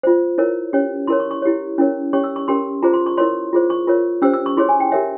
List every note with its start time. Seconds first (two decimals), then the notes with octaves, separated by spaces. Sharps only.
0.03 F4 C5
0.38 E4 A#4 C#5
0.73 C#4 G4 C#5
1.07 E4 A#4 C#5 C6
1.20 C#6
1.31 C#6
1.42 E4 G4 C#5
1.78 C#4 E4 A#4 C#5
2.13 C#4 G4 C#5 C#6
2.24 E6
2.36 C#6
2.48 C#4 G4 A#4 C6
2.83 F4 G#4 C5 A#5
2.94 C6
3.06 C#6
3.18 E4 A#4 C#5 C6
3.53 F4 G#4 C5
3.70 C#6
3.87 F4 A#4 C#5
4.22 C#4 G4 C5 E6
4.34 E6
4.46 C#6
4.57 E4 G#4 C#5 C6
4.69 G#5
4.80 G5
4.92 G4 A#4 C#5 E5